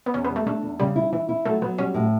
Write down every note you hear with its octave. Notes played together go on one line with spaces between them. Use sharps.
B3
E2 C#4
B3
G3
A3
A3 D4
E2
C#3 G3
E4
E3 E4
E4
F#3 A3
F#3 B3
G3 C#4
A2